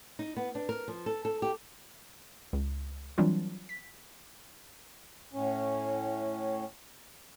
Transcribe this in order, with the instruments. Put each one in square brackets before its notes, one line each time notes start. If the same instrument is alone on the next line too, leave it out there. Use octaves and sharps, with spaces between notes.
[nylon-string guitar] D#4
B3
D4
A#4
F3
A4
A4
G4
[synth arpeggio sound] C#2
E3 F#3 G3 C4 D4 F4
B6
[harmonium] A2 C#4